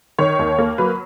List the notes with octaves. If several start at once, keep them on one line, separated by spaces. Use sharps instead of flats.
D#3 C#5
D#2
A#3
F#3 B4